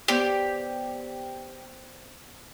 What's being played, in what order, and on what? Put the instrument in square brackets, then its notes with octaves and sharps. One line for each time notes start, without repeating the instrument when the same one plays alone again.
[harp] B3 C5 D5 [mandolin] G4